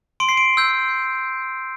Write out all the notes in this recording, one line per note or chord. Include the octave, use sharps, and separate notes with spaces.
C6 D7
C7
D7
E6 G6